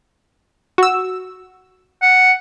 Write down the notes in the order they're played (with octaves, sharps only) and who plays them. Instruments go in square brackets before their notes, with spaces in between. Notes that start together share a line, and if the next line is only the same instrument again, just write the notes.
[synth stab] F#4 E6
[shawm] F#5